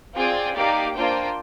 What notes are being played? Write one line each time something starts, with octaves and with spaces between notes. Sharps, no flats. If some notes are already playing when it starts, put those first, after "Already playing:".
C4 F4 G#4 D5 G5
A#3 D#4 G4 D5 F5
A#3 D4 F4 C5 G5